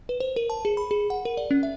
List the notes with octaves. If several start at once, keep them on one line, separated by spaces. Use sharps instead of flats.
B4
C5
A#4
A5
G#4
B5
G#4
F#5
A#4
D5
C#4
E5